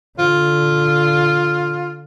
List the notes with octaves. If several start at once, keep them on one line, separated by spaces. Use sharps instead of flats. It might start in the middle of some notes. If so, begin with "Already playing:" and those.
D3 F4